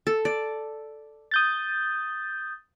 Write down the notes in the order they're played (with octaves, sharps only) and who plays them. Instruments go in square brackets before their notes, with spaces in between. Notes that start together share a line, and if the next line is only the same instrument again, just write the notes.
[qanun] A4
D5
[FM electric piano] D#6 G6 A6